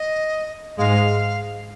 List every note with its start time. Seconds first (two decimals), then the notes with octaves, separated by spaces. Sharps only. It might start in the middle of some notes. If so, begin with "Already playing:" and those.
Already playing: D#5
0.78 G#2 G#3 F5